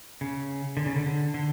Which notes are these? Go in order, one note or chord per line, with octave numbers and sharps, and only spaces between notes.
C#3
D3
C#3
D3
D3
D3